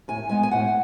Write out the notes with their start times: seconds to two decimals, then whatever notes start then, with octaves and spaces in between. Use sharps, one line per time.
0.08 A2 G#5
0.29 G#3 B3 G#5
0.43 G#5
0.51 A2 F#5